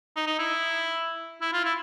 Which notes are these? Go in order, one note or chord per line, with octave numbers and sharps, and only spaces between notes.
D#4
D#4
E4
E4
F4
E4